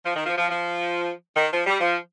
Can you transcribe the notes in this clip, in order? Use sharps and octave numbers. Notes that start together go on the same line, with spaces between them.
F3
D#3
F3
F3
F3
D#3
F3
G3
F3